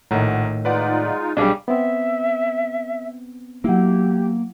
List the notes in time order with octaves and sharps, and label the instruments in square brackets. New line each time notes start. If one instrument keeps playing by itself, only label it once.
[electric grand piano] A#1 F#5 A#5 [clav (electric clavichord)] A2 D#3
[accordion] G#3 D#4 F4 [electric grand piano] B4 D5 F#5
[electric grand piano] B1 G#4 F5 [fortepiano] G3 D4
[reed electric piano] B3 C4 [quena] E5
[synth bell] F#3 E4 [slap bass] A#3 [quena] G4